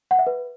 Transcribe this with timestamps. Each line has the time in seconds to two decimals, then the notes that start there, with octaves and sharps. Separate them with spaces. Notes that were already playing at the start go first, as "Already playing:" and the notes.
0.11 F#5
0.19 E5
0.27 B4